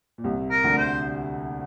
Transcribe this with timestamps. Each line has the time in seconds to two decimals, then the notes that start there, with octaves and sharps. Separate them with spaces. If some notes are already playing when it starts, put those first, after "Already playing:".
0.18 A#2
0.24 C2 C3
0.51 A#4
0.64 D2 D3
0.78 C5